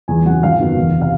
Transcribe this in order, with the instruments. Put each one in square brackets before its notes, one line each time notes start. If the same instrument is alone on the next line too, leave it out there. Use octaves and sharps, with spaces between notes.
[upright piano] E2 G#5
C#3 F#3 F#5
G#1 F5
F#2 D#3 F#3 B3
E1
C3 F5